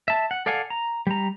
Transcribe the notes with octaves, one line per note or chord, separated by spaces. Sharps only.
E5 A5
F#5
A4 D5 F5 F#5 G#5
A#5
G3 A#5